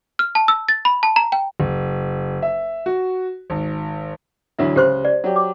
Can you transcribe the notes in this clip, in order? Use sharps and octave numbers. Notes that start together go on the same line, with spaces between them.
F6
A5
E6
A6
B5
A5
A#5
G5
F#1
E5
F#4
G#1
D2 E3 F#3 E5
C#2 G4 C5 C6 F#6
D5
F#3 G4
D6